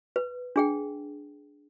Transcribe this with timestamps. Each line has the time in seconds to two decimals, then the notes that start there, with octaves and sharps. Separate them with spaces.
0.16 B4
0.56 D4 G#4 G5